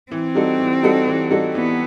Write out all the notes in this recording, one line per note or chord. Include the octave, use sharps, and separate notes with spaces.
E3 C4
G3 D#4 F#4 A4
E3
G3 D#4 F#4 A4
E3
G3 D#4 F#4 A4
E3 B3